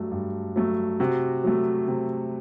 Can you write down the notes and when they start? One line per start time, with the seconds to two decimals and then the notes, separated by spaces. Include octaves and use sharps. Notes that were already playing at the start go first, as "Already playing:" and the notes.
Already playing: G2 F#3 A3
0.11 G2
0.56 F#3 A3
1.00 C3 F#4
1.44 F#3 A3
1.88 C3